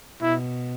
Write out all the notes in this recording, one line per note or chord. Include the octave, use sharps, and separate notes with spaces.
B2 E4